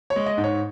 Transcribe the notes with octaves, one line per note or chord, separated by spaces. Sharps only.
C#5
G#3
D#5
G#2
C#5